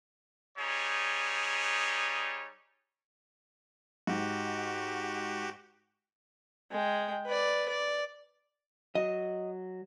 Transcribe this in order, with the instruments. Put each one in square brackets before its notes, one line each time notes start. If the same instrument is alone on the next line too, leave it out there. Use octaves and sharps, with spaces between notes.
[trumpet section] G3 D#4 G#4 C#5
[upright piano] G#2 [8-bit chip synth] F#4 G4
[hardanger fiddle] G#3 G5
B4 D5
D5
[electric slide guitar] F#3 [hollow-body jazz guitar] D#5